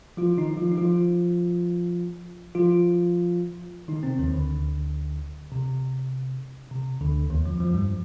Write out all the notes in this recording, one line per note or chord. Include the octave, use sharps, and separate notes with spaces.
F3 F4
D#3 D#4
F3 F4
D#4
F3 F4
F3 F4
D#3 D#4
C3 C4
D#2 D#3
D2 D3
C3
C3
D2 D3
D#2 D#3
F2 F3
F2 F3
G2 G3
F3